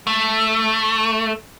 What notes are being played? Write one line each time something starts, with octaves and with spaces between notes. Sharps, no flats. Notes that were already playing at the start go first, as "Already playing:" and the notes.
A3